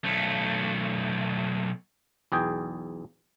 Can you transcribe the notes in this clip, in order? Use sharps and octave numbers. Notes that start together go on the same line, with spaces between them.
B1 A3
B1 E2 G#4 G5